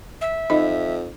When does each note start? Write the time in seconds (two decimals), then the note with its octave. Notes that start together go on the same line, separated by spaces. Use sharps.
0.21 E5
0.50 F2 D#4 D#5